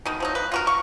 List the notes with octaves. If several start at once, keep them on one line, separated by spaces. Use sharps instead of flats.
B2 D#3
F3 F#3 D#4
B4
F4 F#4 A#4
C#6